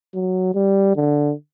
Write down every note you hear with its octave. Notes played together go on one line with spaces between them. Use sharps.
F#3
G3
D3